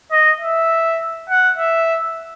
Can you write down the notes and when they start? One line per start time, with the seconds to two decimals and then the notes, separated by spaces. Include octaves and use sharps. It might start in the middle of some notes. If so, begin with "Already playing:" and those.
0.12 D#5
0.41 E5
1.30 F#5
1.58 E5